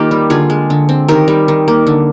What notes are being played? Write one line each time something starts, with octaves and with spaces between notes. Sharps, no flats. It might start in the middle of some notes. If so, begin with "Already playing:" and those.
Already playing: D#3 A#3 D#4 F4 G4
G3
D3 F4 G#4
G#3
D3
C4
D#3 G4 A#4
G3
D#3
A#3
D3